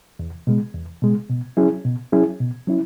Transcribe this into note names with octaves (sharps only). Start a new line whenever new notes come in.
E2
B2 G#3
E2
B2 G#3
B2
F#3 C#4 E4 G#4
B2
F#3 C#4 E4 G#4
B2
F#3 C#4 E4